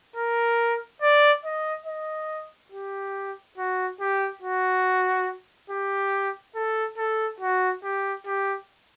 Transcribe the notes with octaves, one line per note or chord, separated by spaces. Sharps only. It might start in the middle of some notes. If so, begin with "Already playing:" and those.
A#4
D5
D#5
D#5
G4
F#4
G4
F#4
G4
A4
A4
F#4
G4
G4